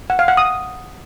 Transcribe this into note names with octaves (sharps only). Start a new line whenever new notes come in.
F#5
F5
F#5
D#6